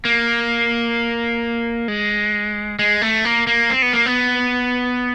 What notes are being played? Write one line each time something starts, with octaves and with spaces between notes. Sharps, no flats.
A#3
G#3
G#3
A3
A#3
A#3
C4
B3
A#3
B3